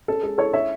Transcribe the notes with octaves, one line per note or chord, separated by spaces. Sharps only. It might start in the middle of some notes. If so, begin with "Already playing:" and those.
C#4 A4
G#3 A4
E4 A4 C#5
C#4 C#5 E5